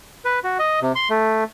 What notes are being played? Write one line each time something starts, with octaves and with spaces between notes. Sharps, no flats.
B4
F#4
D#5
C3
C6
A3